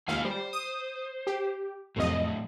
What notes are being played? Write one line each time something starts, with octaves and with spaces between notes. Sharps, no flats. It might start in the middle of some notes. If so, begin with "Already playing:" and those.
D#2 G#3 F4 F5 G#5
G3 C5
D#6
G4
C2 F2 A2 F#3 D#5